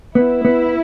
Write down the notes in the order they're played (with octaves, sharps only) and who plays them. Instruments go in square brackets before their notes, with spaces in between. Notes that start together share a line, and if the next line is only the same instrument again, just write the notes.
[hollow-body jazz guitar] B3 [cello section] E4
[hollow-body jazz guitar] B3